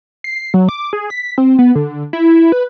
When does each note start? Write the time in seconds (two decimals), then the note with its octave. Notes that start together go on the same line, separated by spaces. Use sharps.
0.24 C7
0.54 F#3
0.69 D6
0.93 G#4
1.10 B6
1.38 C4
1.59 B3
1.75 D3
2.13 E4
2.52 B4